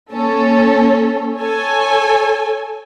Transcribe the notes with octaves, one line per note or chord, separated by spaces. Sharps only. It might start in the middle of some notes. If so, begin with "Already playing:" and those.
A#3 C#4 A4
A4 C#5 G#5